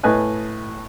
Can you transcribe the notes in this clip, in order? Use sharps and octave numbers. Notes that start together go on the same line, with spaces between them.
A2 B4 D#5 G#5 F#6